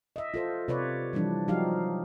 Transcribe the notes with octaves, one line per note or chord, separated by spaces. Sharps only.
D#5 E5
F4 A4 C5
C3 F4 B4 C#5 D5
E3 F3 G3 D4
F3 F#3 D#4 F#4 G4 F5